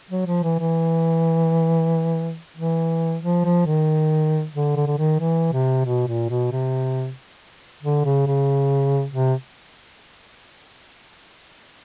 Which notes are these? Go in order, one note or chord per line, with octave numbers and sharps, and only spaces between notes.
F#3
F3
E3
E3
E3
F3
F3
D#3
D3
D3
D3
D#3
E3
C3
B2
A#2
B2
C3
D3
C#3
C#3
C3